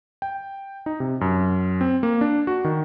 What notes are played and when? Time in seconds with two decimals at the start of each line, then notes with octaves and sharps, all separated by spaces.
0.22 G5
0.86 D#4
1.00 C3
1.21 F#2
1.81 C4
2.03 A#3
2.21 D4
2.47 F#4
2.65 D#3